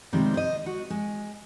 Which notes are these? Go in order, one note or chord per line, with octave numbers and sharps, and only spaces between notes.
C3 D#3 G3 G#3 B3 C4
C5 D#5
F#4
G#3